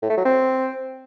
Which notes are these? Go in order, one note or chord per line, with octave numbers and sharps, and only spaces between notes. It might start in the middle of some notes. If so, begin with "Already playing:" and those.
A2
A3
F#3
C4